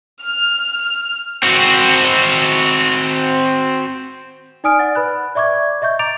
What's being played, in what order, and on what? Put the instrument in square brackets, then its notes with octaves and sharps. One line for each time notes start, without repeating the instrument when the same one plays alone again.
[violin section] F6
[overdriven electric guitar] C4 F#4
[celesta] D#4 D5 G#5 D#6 F6 D7
D5 F#5 A6
B4 B5 F#6
D5 E5 C#6 D6 G#6
D#5 E5 C#6 G6
A#5 D6 A6 D7 F7